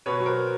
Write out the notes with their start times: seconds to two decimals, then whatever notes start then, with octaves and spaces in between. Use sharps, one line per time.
0.06 B2 B4 C#5
0.20 F#3
0.26 A#4 C5